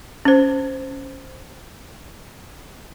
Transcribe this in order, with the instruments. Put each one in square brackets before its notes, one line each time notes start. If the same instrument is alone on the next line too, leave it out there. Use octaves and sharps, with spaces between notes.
[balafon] C#4 C5